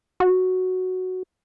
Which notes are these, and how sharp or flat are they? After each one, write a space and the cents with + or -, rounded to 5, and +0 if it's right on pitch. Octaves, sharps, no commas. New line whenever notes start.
F#4 +0